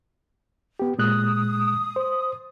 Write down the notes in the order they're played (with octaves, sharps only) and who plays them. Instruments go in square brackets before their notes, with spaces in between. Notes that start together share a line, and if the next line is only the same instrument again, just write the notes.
[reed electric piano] B3 G4
[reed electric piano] A#2 G#3 F#6 [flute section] D#6
[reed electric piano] C5